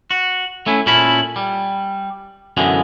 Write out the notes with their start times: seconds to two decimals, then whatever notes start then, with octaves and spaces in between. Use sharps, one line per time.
0.11 F#4
0.66 A3 C#4 E4
0.86 A#2 C#4 E4 A4 B5
1.36 G3
2.57 F#2 B2 D3 E3 G#3